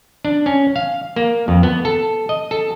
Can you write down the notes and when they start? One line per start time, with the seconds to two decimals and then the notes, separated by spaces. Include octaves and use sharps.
0.25 D4
0.46 C#4
0.76 F5
1.16 A#3
1.48 F2
1.63 B3
1.85 A4
2.29 D#5
2.51 A4